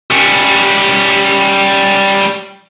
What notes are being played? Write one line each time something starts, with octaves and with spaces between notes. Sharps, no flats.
G3 C#4